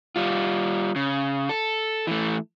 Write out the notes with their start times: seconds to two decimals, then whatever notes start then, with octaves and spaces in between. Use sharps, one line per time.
0.16 G3 F4
0.96 C#3
1.49 A4
2.07 E3 A3